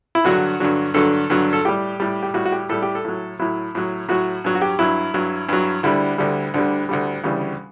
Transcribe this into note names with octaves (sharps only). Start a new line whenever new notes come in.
E4
G2 D3 F#3 F#4
G2 D3 F#3
G2 D3 F#3 A4
G2 D3 F#3
A4
A2 G3 G4
A2 G3
G4
A2 G3 F#4
F#4
G4
A2 G3 A4
G4
A4
A2 F#3
A2 F#3 E4
A2 F#3
A2 F#3 F#4
G2 F#3
F#4
G4
G2 F#3 E4
G2 F#3
G2 F#3
D2 D3 G3 E4
D2 D3 G3
D2 D3 G3
D2 D3 G3
D2 C#3 E3 G3